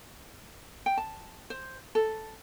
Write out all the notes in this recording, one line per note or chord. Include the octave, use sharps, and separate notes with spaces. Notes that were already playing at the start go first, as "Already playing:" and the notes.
G5
A5
C5
A4